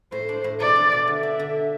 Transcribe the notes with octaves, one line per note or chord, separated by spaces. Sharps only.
A2 C5
D4
A2
B2 D5
D4
B2
D3 E5
D4
D3